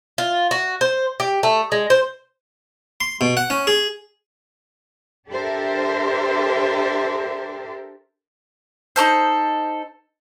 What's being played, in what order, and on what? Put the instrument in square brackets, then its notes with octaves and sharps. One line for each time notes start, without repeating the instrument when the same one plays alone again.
[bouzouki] F4
F#4
C5
G4
A3
G#3
C5
[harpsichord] C6
B2
F#5
C#4
G#4
[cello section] D4 G4 A4 A#4 C5 E5
[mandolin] D#4 G4 A4 C5